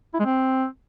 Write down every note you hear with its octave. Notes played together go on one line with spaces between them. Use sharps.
E4
G#3
C4